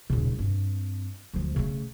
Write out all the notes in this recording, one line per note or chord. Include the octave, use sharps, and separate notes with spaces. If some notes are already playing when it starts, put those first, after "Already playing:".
D#1 C#3
G2 C4
D2 F3
C#3 A3